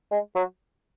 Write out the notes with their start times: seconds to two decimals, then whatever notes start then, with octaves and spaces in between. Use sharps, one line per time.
0.11 G#3
0.35 F#3